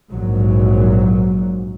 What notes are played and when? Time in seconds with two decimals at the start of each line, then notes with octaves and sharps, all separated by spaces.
0.12 A#1 G#2 F#3